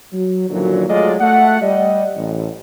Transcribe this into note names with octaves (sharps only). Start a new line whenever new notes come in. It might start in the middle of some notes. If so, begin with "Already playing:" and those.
F#3
F#2 A#2 D3 D#3 F3 F#3
F#3 G#3 A3 F4 D5 D#5
A3 F#5
G3 D5 D#5
A1